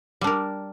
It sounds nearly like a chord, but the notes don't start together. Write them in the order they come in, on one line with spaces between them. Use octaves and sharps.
G3 D4 A#4